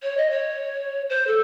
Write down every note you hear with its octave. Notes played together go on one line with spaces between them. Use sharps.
C#5
D#5
C#5
C5
A4